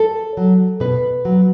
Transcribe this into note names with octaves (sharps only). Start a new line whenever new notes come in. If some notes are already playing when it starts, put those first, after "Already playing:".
Already playing: A4
F#3
B2 B4
F#3